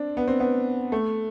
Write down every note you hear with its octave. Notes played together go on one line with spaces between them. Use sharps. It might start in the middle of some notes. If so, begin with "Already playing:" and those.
Already playing: C4 D4
B3
C4
B3
A3